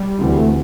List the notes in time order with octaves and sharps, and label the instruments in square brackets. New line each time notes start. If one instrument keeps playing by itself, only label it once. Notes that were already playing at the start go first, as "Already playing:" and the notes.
Already playing: [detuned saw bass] G3
[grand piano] D2 C3 E3
[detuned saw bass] A3